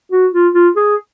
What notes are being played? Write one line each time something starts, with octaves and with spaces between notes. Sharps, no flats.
F#4
F4
F4
G#4